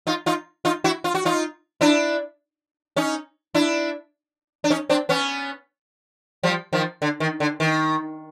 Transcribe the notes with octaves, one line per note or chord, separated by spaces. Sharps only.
D#4 F4
D#4 F4
D#4 F4
E4 F#4
F4
F#4
D#4 F4
D4 E4
C#4 D#4
D4 E4
D4
C#4 D#4
C4 D4
B3 C#4
F3 G3
D#3 F3
D3
D#3
D3
D#3